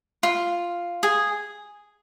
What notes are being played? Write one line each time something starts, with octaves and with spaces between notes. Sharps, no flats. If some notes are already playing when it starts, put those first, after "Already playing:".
F4
G#4